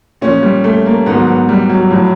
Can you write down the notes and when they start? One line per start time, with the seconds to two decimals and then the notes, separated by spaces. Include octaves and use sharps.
0.21 A#2 F3 C#4
0.43 G3
0.64 A3
0.86 A#3
1.06 G#2 D#3 F#3 B3
1.27 B3
1.49 G3
1.69 F#3
1.90 A2 F3 F#3